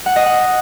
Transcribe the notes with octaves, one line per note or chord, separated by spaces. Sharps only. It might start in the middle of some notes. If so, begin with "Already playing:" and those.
F#5
D#5
F#5